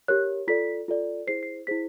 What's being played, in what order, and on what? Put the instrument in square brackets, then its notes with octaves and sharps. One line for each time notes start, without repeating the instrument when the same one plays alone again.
[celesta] G4 A#4 C#5 F#6
F4 A4 D5 B6
F4 A4 D5
E4 G#4 C5 C7
C7
E4 G#4 C5 B6